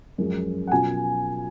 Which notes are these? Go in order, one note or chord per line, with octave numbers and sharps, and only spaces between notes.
F#2 F3 G#3
F#5
B2 F#3 C#4 F4 G#5